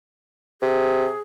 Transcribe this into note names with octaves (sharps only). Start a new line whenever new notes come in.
C3 G#4